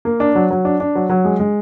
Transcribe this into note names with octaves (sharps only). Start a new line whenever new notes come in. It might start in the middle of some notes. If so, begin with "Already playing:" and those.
A#3
D4
F#3
F#3
D4
D4
F#3
F#3
G#3
G#3